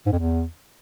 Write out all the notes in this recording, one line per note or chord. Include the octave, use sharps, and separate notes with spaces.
G#2
F2
E2